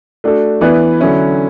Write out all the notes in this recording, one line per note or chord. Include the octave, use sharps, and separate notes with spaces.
A3 D4 F#4 A4
E3 B3 E4 B4 D5
D3 F#3 C#4 E4